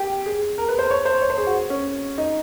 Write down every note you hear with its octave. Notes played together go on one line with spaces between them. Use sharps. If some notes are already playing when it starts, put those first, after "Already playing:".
Already playing: G4
G#4
A#4
B4
C5
C#5
C5
C#5
C5
G#4
F#4
C#4
D#4